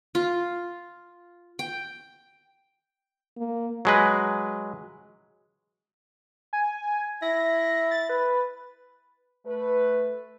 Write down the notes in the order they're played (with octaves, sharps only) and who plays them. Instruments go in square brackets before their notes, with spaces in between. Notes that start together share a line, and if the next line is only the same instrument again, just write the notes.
[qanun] F4
G5
[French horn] A#3
[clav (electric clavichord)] F#3 G#3 B4
[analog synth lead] G#5
[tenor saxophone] E4 [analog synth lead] A#6
[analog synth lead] A6
B4
[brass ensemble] A3 B4